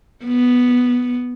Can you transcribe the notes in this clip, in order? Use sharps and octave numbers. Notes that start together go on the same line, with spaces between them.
B3